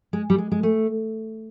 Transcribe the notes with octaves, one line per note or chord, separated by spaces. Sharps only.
G#3
G3
G#3
G#3
A3